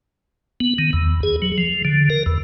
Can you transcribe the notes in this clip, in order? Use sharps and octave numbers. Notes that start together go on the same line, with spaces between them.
B3
D#3
E2
G#4
F#3
F3
D3
A#4
E2